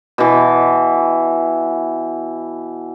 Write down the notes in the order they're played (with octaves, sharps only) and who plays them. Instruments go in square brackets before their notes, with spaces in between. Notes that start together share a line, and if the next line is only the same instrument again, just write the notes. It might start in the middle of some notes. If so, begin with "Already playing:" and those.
[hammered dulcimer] B2 E3